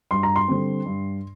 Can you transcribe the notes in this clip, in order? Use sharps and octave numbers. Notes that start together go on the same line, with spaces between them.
G2 C6
A#5
C6
D3 G3 C4
G2